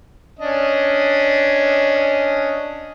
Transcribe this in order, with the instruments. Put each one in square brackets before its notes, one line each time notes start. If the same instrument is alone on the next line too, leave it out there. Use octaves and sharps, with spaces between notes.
[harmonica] C#4 D4 D#5